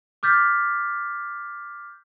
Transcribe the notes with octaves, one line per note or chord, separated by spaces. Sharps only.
D6 F6 G6 A6 B6